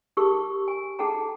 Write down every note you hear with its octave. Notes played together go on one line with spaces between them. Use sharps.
D#4 G4 G#4 A#4 C#6 E6
G#5
D#4 G#4 A4 F#5 G5 A#5